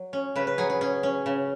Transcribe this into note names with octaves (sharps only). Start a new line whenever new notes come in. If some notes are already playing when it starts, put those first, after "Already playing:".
Already playing: F#3
C#4
C#3 B4
B4
F#3 G#4
G#4
C#4 G#4
C#4
C#3